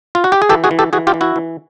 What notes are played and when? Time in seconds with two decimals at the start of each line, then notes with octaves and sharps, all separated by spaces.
0.15 F4
0.24 F#4
0.32 G4
0.42 G#4
0.49 E3 G4 A4
0.64 F#4 G#4
0.71 E3
0.79 G4 A4
0.93 E3 F#4 G#4
1.07 F4 G4
1.14 E3
1.21 E4 F#4
1.36 E3